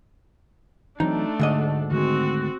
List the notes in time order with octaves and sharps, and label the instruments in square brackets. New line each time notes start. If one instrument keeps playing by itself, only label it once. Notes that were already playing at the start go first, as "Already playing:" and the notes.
[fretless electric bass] E3 F#3 C4 [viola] A3 D4 [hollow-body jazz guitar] D#4
[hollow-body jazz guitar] D2 G#2 D#5 [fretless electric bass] D3
[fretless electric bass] D3 D#3 G#3 [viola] C4 F#4